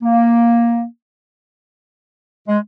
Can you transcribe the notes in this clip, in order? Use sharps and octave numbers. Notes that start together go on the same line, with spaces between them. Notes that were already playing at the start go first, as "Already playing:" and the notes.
A#3
G#3